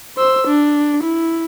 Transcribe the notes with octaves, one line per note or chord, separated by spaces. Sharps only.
C5 E6
D4
E4